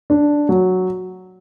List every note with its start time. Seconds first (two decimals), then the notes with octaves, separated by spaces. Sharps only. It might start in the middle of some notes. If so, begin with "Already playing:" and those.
0.10 D4
0.49 F#3